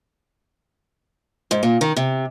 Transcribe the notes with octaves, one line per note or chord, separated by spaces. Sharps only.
G#2
A#2
D#3
C3